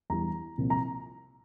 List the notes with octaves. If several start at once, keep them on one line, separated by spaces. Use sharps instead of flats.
E2 E3 G3 A#5
C2 A#2 F3 C4
A#5